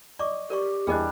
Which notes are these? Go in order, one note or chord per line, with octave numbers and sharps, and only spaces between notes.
D5 D#5 C#6 D6
G4 A#4 D5 C#6
E2 G3 D4 E4 G#4 A#4 D#5 G#5